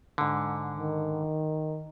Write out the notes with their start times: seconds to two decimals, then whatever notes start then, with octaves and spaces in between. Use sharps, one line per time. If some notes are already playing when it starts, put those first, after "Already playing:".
0.18 G#2 D3
0.74 D#3